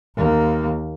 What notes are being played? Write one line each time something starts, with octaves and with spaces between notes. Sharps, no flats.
D#2 A#3